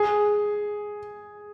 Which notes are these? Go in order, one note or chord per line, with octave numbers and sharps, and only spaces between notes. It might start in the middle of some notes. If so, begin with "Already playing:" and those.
Already playing: G#4